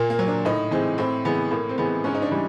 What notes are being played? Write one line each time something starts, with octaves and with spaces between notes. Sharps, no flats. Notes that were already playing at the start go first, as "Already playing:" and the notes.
Already playing: A#2 A#3
A#3
F#3
D4
A2 D#4
E3 G#3 C4
A2 C4
E3 G#3 B3
A2 A#3
C4
E3 G#3 B3
G#2 C#4
D#4
D4
E3 G3